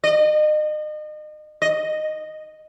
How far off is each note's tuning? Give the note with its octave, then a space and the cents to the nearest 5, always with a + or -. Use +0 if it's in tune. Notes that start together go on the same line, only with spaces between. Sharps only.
D#5 -35
D#5 -10